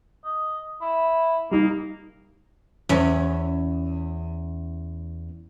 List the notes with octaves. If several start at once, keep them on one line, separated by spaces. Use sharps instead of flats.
D#5
E4
G3 A#3 D#4
E2 C#4